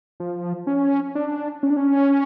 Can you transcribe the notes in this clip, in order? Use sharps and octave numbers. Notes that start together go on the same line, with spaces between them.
F3
C#4
D4
C#4
D4
C#4